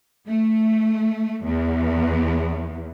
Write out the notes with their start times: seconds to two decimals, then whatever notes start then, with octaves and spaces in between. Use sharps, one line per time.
0.27 A3
1.45 E2